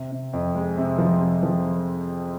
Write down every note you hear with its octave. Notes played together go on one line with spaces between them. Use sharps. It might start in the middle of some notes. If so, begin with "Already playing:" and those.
Already playing: C3
C3
F2
G#3
C3
F3
C3
F3